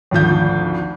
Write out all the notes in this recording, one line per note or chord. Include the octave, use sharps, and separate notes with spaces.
G#1 D2 F3 G6